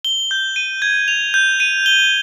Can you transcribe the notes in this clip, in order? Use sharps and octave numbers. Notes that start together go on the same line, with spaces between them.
G7
G6
D#7
G#6
F7
G6
D#7
G7